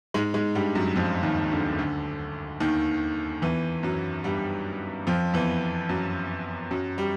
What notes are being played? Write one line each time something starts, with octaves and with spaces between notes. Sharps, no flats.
G#2 G#3
G#2 G#3
G2 G3
F#2 F#3
F2 F3
D#2 D#3
D2 D3
D2 D3
D#2 D#3
E2 E3
F#2 F#3
G2 G3
F2 F3
E2 E3
F#2 F#3
F#2 F#3
G3